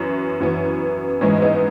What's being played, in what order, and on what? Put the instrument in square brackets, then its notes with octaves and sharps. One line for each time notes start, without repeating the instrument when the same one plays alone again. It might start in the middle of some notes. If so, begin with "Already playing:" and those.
Already playing: [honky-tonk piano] F#2 E3 B3 C#4
F#2 E3 B3
G#2 E3 G#3 B3 C#4
B3 D#4